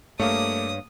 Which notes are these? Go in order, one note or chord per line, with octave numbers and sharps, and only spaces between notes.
G2 A3 A#3 C#5 F5 D6 D#6